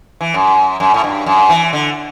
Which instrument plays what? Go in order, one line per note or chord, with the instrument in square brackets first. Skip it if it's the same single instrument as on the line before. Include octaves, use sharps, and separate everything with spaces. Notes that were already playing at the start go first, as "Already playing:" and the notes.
[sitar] E3
F#2
F#2
A2
G2
F#2
E3
D3